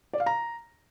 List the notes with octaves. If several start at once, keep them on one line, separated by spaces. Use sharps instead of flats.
D5
F5
A#5